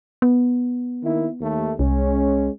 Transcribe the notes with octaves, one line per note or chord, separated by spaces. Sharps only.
B3
D#3 A#3 E4
D#2 A3
C2 G#3 C#4